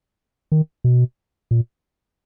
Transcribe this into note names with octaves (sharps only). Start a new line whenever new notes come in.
D#3
B2
A#2